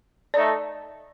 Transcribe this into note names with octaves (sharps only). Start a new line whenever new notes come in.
A3 D#4 A4 D5